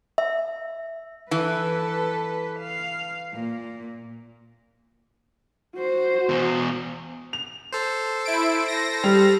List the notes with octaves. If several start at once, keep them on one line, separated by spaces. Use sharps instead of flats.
E5
E3 A4 B4
F5
A#2
F#4 C5
E2 B2
F7
A4 C5
E4 D7
A#6
G3